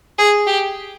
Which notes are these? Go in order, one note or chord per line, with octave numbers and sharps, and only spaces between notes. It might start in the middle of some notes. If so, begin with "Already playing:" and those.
G#4
G4